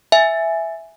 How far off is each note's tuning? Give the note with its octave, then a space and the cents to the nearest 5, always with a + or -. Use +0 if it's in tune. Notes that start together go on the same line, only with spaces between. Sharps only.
E5 +0 G#5 +0